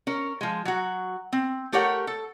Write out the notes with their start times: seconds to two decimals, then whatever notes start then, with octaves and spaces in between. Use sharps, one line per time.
0.07 C#4 A#4
0.41 F3 G#3
0.65 F#3 F#4
1.33 C4
1.72 A3 G4 A#4 C#5 F#5
2.07 A4